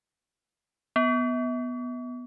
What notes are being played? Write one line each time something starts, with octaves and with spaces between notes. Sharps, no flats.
B3